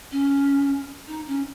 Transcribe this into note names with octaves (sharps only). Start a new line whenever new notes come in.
C#4
D#4
C#4